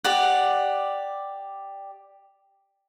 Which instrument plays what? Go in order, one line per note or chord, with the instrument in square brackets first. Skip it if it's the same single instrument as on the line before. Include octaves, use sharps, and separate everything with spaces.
[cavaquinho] G4 D5 F#5